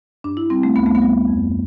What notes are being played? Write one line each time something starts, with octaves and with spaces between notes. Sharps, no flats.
G2 D4
E4
G3 C4
A3
D2 B3
A3
B3
G3
F2